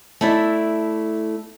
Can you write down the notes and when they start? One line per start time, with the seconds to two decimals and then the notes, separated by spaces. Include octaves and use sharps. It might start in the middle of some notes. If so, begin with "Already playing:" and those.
0.21 A3 E4 D5